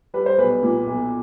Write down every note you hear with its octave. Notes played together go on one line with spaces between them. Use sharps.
G3 B4
C5
B1 B4
A#2
B1